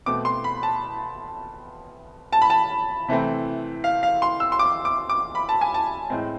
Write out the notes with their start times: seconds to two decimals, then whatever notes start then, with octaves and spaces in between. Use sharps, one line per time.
0.06 B2 A3 C4 D6
0.25 C6
0.44 B5
0.63 A5
2.32 A5
2.42 B5
2.50 A5
3.08 C3 E3 A3 C4
3.84 F5
4.03 F5
4.22 C6
4.40 E6
4.52 C6
4.59 D6
4.85 D6
5.09 D6
5.35 B5
5.49 A5
5.61 G#5
5.74 A5
6.10 A2 G#3 C4